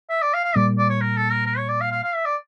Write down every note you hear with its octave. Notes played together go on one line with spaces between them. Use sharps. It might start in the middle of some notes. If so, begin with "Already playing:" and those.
E5
D5
F5
F5
A#2 G3 A#3 D5
D5
C#5
A#4
A4
A#4
A#4
C#5
D5
F5
F5
F5
E5
D5